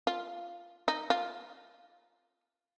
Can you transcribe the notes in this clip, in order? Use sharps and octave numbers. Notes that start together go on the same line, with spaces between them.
F4
D#4
F4